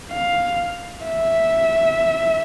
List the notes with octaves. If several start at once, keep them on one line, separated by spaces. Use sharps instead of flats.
F5
E5